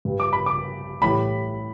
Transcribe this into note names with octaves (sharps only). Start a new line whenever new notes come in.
G2 G3
D6
B5
D6
A2 E3 G3 B5